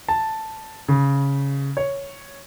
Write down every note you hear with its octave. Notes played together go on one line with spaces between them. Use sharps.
A5
C#3
C#5